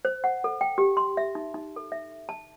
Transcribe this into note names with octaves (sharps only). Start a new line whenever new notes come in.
C5
F#5
A4
G5
G4
C6
E5
D#4
D#4
A4
E5
A5